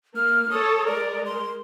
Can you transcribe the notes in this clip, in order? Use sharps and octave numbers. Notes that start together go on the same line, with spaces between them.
A#3 F6
A4 C#5 D#6
G#3 A#4 D5
C6